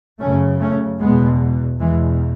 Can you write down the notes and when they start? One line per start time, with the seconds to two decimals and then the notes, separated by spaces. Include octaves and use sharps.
0.20 F#2 C#3 A3 C#4
0.60 A3 C#4
1.00 E2 B2 G#3 B3
1.80 E2 B2 E3 G#3